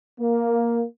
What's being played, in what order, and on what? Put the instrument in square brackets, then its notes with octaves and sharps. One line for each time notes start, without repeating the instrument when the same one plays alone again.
[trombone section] A#3